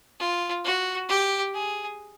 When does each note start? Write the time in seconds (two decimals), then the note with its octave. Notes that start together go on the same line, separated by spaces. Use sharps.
0.20 F4
0.65 F#4
1.09 G4
1.54 G#4